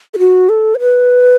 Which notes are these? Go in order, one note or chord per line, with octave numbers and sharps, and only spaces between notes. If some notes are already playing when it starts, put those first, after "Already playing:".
A4
F#4
A4
C#5
B4